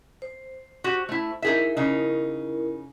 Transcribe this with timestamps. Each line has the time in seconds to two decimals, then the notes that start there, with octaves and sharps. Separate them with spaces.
0.22 C5
0.84 F#4 G4
1.09 A3 E4
1.42 D#4 E4 G#4 A#4 E5
1.77 C#3 D#4